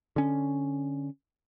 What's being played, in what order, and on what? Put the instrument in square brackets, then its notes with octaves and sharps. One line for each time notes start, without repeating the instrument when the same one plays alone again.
[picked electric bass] D3 C#4